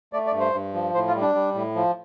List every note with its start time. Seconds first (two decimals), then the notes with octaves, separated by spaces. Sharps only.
0.13 A3 D5
0.27 D5
0.33 G2
0.40 C5
0.54 G2
0.74 F3
0.94 A2 C5
1.08 F4
1.14 G3
1.21 D4
1.35 G3
1.55 A2
1.76 F3